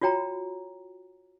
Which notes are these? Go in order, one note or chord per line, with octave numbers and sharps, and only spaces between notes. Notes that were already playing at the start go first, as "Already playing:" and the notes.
F4 F#4 C#5 G5 A#5